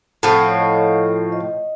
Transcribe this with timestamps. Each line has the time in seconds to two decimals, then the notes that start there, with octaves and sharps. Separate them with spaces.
0.23 A2 F3 C4 F#5
0.35 F5
0.47 C#5
0.59 D#5
1.32 D#5